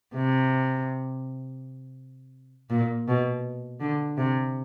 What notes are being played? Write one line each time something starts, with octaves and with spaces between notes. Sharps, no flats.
C3
A#2
B2
D3
C3